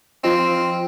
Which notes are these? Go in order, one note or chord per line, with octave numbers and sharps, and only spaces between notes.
F3 C4 F4 D#5